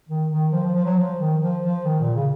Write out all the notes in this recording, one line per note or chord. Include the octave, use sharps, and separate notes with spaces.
D#3
D#3
F3
F3
F3
F#3
F3
D#3
F3
F3
D#3
A#2
C#3